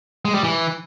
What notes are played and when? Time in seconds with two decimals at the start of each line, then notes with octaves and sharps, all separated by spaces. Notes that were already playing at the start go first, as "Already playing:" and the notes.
0.25 G#3
0.34 G3
0.44 E3